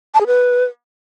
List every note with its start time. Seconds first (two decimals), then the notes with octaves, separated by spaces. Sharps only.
0.14 A5
0.20 G#4
0.27 B4